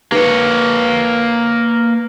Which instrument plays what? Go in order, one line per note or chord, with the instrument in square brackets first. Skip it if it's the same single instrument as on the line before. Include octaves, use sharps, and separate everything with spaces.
[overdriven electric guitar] A#3 C#5 [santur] B4